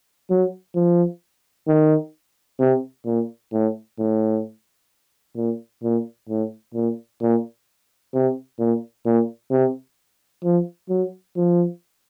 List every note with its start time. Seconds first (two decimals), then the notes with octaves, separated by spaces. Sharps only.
0.30 F#3
0.75 F3
1.67 D#3
2.59 C3
3.06 A#2
3.53 A2
3.99 A2
5.36 A#2
5.83 A#2
6.29 A2
6.74 A#2
7.22 A#2
8.13 C3
8.59 A#2
9.06 A#2
9.51 C3
10.44 F3
10.89 F#3
11.36 F3